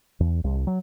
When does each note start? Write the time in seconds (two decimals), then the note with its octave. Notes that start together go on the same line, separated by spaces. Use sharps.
0.20 E2
0.44 C2
0.67 F#3